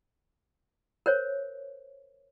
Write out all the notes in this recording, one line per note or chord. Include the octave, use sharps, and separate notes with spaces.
A#4 C5 C#5